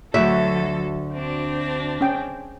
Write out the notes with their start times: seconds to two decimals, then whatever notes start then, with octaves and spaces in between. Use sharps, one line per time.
0.14 D2 F#3 F#4 A4 E5
1.14 C4 D4
2.01 C#4 G5